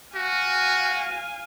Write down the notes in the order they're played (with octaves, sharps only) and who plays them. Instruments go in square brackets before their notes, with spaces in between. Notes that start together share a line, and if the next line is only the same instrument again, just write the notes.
[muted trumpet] F#4 [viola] F5 G#5